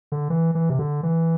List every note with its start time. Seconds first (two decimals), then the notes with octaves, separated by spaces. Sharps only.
0.12 D3
0.30 E3
0.55 E3
0.69 C3
0.79 D3
1.03 E3